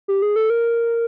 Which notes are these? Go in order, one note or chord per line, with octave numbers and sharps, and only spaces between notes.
G4
G#4
A4
A#4